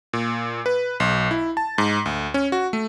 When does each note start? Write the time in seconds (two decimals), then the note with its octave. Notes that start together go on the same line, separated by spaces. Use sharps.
0.13 A#2
0.66 B4
1.00 B1
1.31 E4
1.57 A5
1.78 G#2
2.06 D2
2.34 C#4
2.52 F#4
2.73 A3